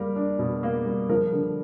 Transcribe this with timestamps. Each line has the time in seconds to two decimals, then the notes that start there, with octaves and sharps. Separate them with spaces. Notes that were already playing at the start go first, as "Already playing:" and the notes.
Already playing: G3 A#3 A#4
0.16 D4
0.39 B2
0.63 A#3
0.86 G3
1.09 F3 A#4
1.33 D3